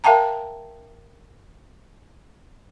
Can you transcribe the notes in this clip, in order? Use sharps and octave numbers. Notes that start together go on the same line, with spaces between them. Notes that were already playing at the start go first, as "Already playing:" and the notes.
A#4 E5 F5 G5 A5 A#5